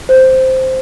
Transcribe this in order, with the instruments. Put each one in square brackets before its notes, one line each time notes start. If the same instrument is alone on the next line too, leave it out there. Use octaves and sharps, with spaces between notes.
[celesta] C5